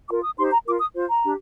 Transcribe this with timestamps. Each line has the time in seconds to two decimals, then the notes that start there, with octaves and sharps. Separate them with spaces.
0.09 F4 D6
0.13 A#4
0.23 D#6
0.38 D#4 G4 C5 C6
0.52 A#5
0.66 F4 A#4 D6
0.80 D#6
0.94 F4 C5
1.09 A#5
1.23 D4 G4